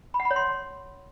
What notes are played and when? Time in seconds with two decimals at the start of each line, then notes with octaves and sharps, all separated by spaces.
0.14 B5
0.20 F#5
0.25 B5
0.31 C#5
0.36 C6